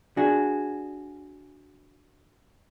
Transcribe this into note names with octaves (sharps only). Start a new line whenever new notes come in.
D4 F#4 G#4